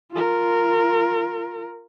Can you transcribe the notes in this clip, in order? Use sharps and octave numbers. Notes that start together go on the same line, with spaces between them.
F4 A#4